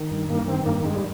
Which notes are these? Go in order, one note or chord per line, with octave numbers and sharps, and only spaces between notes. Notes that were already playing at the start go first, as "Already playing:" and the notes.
Already playing: D#3
G2
G2 A#3
D#3 C4
G2 A#3
G2 G#3
G3